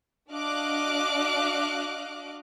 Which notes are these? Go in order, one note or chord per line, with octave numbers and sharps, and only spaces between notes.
D4 F#4 D#5 F5 D6 F#6